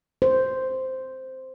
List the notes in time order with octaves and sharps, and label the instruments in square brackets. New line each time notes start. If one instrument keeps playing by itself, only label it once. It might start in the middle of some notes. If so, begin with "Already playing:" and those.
[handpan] C5